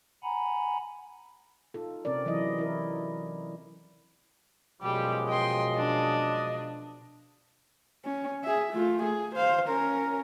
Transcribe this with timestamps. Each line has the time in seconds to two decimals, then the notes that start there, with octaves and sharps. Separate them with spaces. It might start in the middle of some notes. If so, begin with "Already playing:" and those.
0.23 F#5 G#5 A#5 B5
1.74 D#4 F4 A4
2.05 C3 C4 C#4 A#4 D5
2.26 E3 F#3 C4 E4 D#5
2.59 E4 A#4
4.82 F#2 B2 F3 G3 G#3 G4
5.29 D#5 G5 C6
5.76 D4
8.04 C#4
8.43 G#4 E5
8.73 A3 F4
9.03 G#4
9.36 C5 F5
9.69 C#4 A#4